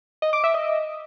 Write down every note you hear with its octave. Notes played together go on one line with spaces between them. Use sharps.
D#5
D6
E5
D#5